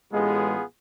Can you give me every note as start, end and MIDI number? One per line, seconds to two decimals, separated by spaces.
0.13 0.55 33
0.13 0.55 56
0.13 0.63 59
0.13 0.63 65
0.13 0.63 68